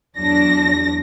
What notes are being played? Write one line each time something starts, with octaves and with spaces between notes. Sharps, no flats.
E2 F#3 D4 A#6